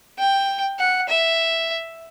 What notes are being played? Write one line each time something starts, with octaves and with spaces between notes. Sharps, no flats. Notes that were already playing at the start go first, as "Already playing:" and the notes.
G5
F#5
E5